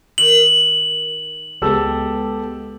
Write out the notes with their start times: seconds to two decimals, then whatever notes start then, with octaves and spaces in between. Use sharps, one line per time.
0.18 D#3 F#7
1.62 C#2 G#3 B3 G4 A4 E6